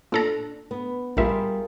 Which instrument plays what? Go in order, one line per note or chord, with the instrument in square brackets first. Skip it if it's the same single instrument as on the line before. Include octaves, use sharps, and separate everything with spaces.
[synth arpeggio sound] A#2 A4 A#5 [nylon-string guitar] D4
[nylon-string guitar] B3
[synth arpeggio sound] A#1 E5 [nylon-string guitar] G3 [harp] F4 G#4 A#4